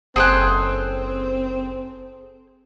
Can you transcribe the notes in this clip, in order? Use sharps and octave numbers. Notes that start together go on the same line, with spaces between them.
F#1 C4 G#4 A4 C5 G5 G#5 F#6